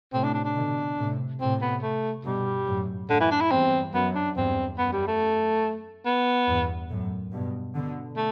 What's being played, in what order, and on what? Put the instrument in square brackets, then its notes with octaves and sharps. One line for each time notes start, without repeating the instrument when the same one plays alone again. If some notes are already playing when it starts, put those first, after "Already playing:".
[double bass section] A2 C3 [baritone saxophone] C4
[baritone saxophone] D4
D4
D4
[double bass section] B2 D3
A2 C3
[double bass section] A2 C3 [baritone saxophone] C4
[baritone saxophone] B3
A3
[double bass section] G2 B2 [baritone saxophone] G3
[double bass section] F#2 A2
[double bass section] F#2 A2 [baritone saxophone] D3
[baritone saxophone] E3
D4
E4
[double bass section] E2 G2 [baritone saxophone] C4
[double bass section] F#2 [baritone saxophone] B3
[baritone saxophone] D4
[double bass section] E2 G2 [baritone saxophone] C4
[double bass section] F#2 [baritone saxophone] B3
[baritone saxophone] G3
A3
B3
[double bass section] E2 G2
F#2 A2
G2 B2
B2 D3
[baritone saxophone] A3